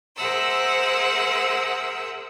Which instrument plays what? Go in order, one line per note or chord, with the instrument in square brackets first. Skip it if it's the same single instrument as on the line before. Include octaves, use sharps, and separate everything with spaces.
[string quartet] G#4 A#4 C5 E5 F#5 E6